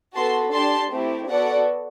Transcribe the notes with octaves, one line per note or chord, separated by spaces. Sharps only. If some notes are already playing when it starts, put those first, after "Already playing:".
B3 F#4 A4 A5 C6
D4 G4 A5 C6
A3 C4 E4 G4
B3 F#4 A4 D5 F#5